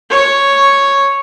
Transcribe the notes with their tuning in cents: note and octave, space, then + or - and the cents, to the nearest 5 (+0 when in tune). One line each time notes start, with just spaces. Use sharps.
C#5 +0